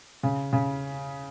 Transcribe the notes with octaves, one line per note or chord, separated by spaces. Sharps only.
C#3
C#3